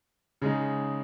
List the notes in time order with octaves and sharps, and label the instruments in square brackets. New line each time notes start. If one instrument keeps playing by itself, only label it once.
[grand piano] C#3 G#3 D#4